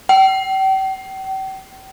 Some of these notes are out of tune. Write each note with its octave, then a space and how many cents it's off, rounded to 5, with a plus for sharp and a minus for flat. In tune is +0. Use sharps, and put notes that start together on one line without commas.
G5 -40